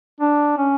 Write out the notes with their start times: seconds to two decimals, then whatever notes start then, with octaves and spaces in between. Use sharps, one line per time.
0.20 D4
0.57 C#4